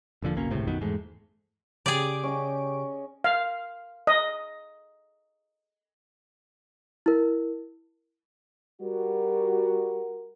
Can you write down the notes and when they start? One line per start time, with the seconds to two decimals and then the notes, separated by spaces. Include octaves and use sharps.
0.22 F1 A#2 D3 F3
0.36 F#1 B1 A#3 C#4
0.51 G1 C#2 A2 C3
0.67 B1 F#2 D#3 B3
0.81 E2 G#2 G#3 A3
1.86 C#3 G4 G#4 D5 D7
2.24 C#4 D#5 C#6
3.24 F5
4.07 D#5
7.06 E4 A#4
8.82 G3 F#4 A#4